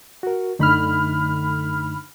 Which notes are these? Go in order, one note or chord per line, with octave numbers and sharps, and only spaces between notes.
F#4 A#4
F#2 D3 A3 D#4 B5 F6